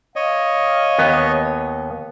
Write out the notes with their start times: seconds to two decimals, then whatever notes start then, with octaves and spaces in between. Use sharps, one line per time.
0.16 C#5 D#5 F5
0.99 D#2 B3